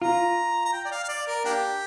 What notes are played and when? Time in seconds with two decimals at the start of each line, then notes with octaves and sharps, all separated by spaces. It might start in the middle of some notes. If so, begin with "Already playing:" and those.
0.02 F4 A#5
0.65 A#5
0.73 G5
0.85 D5
0.91 F5
1.04 F5
1.08 D5
1.27 A#4
1.45 A#3 D4 G4